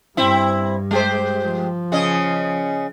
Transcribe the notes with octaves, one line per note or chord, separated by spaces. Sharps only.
G2 C4 E4
G#3 G4 C5
F3
C#3 C#4 D#5